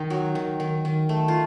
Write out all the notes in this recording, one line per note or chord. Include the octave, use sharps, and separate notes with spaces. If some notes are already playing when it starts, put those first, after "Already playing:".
Already playing: D#3 D#4
F#3
D#3
D#3
D#3
A3
F4